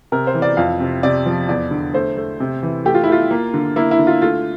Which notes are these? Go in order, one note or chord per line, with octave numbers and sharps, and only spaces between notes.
C3 A#4
C5
E3
D5
F2 F5
C3
C3 D5
F3
E2 D5
D3
A3 C5
A3
C3
E3
A3 G4
F4
E4
A3 F4
A#3
D3
A#3 E4
E4
D3
F4
A3 F4